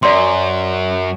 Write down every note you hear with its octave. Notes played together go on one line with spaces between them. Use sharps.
F#2 D5 C6